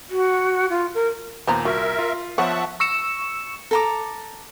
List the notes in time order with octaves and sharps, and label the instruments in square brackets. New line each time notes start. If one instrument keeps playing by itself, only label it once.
[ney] F#4
F4
A#4
[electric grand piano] D#2 A#2 [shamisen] B3 C5 A#5
[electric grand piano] C2 F4 [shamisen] F#4 [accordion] A#4 E5
[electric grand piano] F4
[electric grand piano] F3 F#5 C#6 [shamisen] B3 C#5 [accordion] E5 A5
[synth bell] C#6 E6 C#7 E7
[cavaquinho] A4 A#5 D6